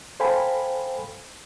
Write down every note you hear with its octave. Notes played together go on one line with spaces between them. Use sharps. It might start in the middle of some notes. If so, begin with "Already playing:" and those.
A4 C5 F5 G5 G#5 B5